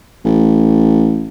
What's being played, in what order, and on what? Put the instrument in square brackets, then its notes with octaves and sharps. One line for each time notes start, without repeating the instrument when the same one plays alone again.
[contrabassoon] A1